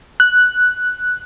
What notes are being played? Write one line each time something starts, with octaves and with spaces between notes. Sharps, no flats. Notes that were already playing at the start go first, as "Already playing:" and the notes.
F#6